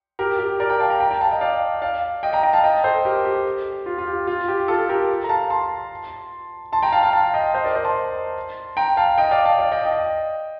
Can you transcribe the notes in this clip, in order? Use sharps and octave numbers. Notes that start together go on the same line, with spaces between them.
G4 A#4
G4
A#4 D5
G5 A#5
F5 A5
G5 A#5
G5 A#5
G5 A#5
F5 A5
D#5 G5
D5 F5
D5 F5
D#5 G5
G5 A#5
G5 A#5
F5 A5
D#5 G5
A4 C5
G4 A#4
G4
F4
F4
G4
F4
G4
F4 A4
G4 A#4
A#5
F5 A5
A5 C6
A5 C6
G5 A#5
F5 A5
F5 A5
F5 A5
D#5 G5
C5 D#5
A#4 D5
C5 D#5
A5 C6
G5 A#5
F5 A5
D#5 G5
D5 F5
F5 A5
D5 F5
D#5 G5
D#5 G5